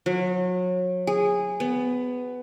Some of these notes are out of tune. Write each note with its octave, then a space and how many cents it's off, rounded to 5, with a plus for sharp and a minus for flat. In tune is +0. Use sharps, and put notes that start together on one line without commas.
F#3 -30
G#4 -15
B3 +15